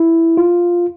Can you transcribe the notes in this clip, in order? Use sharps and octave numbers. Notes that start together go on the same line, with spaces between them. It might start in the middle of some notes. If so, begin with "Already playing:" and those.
Already playing: E4
F4